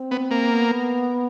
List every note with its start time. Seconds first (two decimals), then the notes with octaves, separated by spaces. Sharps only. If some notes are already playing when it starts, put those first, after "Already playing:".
Already playing: C4
0.11 B3
0.31 A#3
0.50 B3